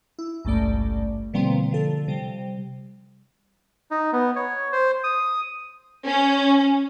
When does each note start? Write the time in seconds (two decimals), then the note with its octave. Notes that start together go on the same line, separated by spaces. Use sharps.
0.19 E4
0.45 G#1 C#2 G2 A3 D5
1.33 B2 D3 F3 G3 A#3 C4
1.71 D3 F3 A4
2.08 C3 G3
3.91 D#4
4.13 B3
4.36 C#5
4.73 C5
5.04 D#6
6.06 C#4